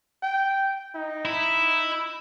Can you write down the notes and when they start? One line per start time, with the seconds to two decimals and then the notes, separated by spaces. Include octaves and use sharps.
0.23 G5
0.95 D#4
1.25 E4